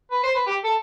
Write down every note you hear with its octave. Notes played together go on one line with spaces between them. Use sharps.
B4
C5
B4
G4
A4